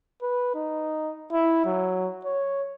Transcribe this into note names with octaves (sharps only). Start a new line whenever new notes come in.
B4
D#4
E4
F#3
C#5